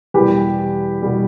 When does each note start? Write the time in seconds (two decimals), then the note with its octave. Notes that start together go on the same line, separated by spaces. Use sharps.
0.14 E2 B2 G3 G4 B4
1.02 B2 G3